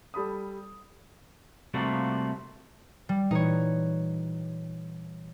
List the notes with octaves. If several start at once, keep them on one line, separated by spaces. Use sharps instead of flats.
G3 A4 B5 D#6
C3 G3 A3 A#3 F4 F#4
G3
A#2 E3 D#4 B4 C#5